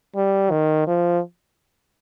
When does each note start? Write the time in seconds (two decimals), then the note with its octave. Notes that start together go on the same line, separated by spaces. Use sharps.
0.16 G3
0.51 D#3
0.87 F3